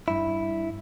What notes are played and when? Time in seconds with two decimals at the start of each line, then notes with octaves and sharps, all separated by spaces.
0.08 G2 E4